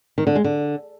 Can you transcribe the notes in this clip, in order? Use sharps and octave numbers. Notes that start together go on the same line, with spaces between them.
D#3
D3
G#3
D3